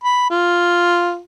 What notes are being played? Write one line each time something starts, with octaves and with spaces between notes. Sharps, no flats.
B5
F4